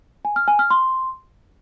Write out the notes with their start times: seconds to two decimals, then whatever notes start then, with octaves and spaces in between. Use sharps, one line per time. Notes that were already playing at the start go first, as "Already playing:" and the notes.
0.25 G#5
0.36 F6
0.48 G#5
0.59 F6
0.71 C6